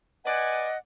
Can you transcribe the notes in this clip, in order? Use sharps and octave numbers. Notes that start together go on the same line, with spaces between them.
B4 D5 D#5 F#5 G#5